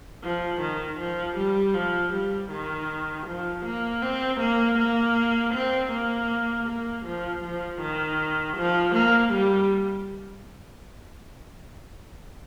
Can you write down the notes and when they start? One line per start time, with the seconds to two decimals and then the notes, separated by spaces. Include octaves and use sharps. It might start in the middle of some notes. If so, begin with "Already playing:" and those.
0.23 F3
0.61 D#3
0.99 F3
1.37 G3
1.75 F3
2.13 G3
2.51 D#3
3.27 F3
3.65 A#3
4.02 C4
4.40 A#3
4.78 A#3
5.54 C4
5.92 A#3
6.68 A#3
7.05 F3
7.43 F3
7.81 D#3
8.57 F3
8.95 A#3
9.33 G3